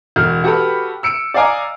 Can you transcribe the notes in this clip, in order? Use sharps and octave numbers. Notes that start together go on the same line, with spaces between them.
E1 F#4 F6
F#4 G4 A4 B4 B5
E6 C#7 D7
D5 D#5 F5 G#5 A#5 D6